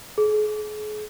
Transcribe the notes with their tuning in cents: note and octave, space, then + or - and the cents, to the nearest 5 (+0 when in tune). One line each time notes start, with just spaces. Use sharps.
G#4 +40